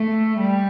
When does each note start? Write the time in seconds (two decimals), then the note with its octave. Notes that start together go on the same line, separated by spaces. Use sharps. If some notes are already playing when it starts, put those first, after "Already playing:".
Already playing: A3
0.38 G3